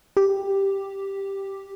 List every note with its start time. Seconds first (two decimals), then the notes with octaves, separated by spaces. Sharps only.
0.17 G4